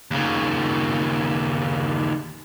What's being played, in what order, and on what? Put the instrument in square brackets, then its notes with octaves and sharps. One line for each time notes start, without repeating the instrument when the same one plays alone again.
[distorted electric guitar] D#2 C#3